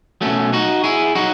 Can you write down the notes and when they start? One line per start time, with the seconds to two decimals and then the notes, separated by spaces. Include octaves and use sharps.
0.21 B2 F#3 A3 C#4
0.53 D#4 F#4
0.84 E4 G#4
1.15 F#3 D#4 F#4